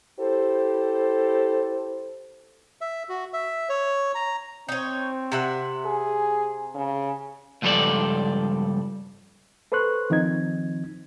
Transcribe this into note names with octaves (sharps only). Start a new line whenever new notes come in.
E4 G4 A4 C5
E5
F#4
E5
C#5
A#5
C4 D#4 C#5
C3 E5 F#5
G#4
C#3
C#2 G2 F3 G3 A4 D5
A4 B4 C5 C6 C#6 F#6
D#3 F3 C4 D#4 G#6